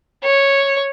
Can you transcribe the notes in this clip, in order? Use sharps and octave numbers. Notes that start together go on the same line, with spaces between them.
C#5